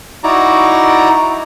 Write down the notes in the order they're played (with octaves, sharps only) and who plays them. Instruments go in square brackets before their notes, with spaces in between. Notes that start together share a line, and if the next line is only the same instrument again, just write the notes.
[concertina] D#4 E4 F#4 D5 A#5